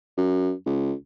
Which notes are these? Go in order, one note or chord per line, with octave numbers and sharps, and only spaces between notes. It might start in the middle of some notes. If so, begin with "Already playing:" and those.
F#2
C#2